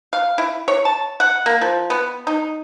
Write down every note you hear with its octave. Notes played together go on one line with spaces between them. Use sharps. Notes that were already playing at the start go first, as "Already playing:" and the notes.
F5
E4
C#5
A5
F#5
A#3
F3
B3
D#4